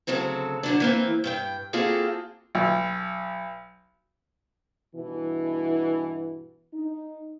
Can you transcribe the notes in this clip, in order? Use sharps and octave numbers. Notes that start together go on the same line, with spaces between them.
D2 C#3 F#3 C4 A4
D3 F#3 D4
E3 A#3 C4
G2 C5 G5
A#3 C4 F4 F#4 G#4 A4
B1
G2 B2 E3
D#4